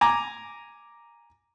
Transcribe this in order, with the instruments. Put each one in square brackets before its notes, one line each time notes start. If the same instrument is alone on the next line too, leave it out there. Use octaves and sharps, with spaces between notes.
[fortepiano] G#5 A#5 D6